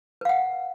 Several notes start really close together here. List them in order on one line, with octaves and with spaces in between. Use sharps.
B4 F5 F#5